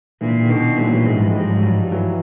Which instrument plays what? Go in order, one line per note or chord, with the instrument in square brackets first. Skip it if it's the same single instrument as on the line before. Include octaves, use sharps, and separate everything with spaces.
[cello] A#2 [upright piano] D3 E3
[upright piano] D#3
[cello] B2 [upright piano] D3 E3
[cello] A#2 [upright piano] E3 F#3
[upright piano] E3 F#3
[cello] G#2 [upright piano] F#3 G#3
[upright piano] F3 G3
G#3
[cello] G#2 [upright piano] F3 G3
[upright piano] F3
F#3
[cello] G2 [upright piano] F3 G3
[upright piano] E3 F#3